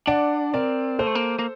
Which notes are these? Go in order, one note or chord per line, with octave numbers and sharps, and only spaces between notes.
D4 D5 F#5
C4 A#4 D5
A#3 A4 C5
A3
A#3
A#3